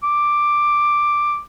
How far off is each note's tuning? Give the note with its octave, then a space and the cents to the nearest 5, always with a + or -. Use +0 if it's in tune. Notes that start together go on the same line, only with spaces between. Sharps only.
D6 +5